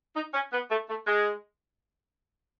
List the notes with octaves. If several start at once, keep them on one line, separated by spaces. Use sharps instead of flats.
D#4
C#4
B3
A3
A3
G#3